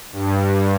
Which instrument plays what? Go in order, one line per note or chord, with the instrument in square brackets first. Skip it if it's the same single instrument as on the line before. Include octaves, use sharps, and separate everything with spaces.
[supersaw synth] G2